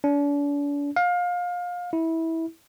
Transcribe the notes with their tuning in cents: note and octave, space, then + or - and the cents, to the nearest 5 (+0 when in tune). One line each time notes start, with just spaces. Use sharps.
D4 -40
F5 +25
E4 -20